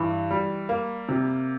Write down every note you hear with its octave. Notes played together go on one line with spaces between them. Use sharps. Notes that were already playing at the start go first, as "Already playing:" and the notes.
Already playing: G2 E3
G3
A#3
C3